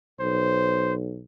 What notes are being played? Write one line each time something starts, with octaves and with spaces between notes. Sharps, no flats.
B1 C5